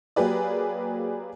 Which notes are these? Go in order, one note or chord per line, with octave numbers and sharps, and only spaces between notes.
F#3 A#3 G4 G#4 B4 D5